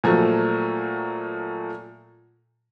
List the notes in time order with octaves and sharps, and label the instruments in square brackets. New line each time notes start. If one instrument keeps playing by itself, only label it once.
[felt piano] A#2 F3 F#3 A3